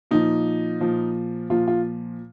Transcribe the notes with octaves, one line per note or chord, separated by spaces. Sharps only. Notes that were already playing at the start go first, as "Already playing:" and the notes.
A#2 F3 D#4
A#2 F3
A#2 F3 F4
F4